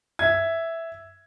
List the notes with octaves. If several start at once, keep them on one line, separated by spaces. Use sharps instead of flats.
E5 G#6